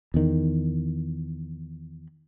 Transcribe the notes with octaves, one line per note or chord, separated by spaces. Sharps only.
E2 D#3